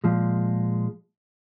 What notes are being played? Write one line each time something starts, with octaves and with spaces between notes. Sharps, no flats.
A#2 F3 G#3